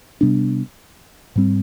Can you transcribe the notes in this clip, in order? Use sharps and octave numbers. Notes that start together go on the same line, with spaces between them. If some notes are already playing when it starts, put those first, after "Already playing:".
C3 G3 B3 D4
G#2 G3 C4